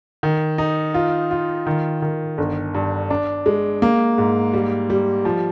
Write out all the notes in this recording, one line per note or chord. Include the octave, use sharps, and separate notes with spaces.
D#3
D#4
F4
F4
D#3
D#3
G1
G2
D4
G#3
A#3
G#2
G3
G3
F3